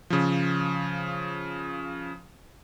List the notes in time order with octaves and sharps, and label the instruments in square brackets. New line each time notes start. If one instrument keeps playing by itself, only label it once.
[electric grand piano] C#3 F3